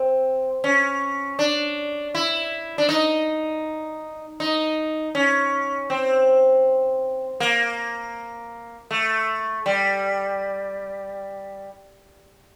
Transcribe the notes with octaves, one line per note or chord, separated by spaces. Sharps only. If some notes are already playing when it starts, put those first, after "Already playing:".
Already playing: C4
C#4
D4
E4
D4
D#4
D#4
C#4
C4
A#3
A3
G3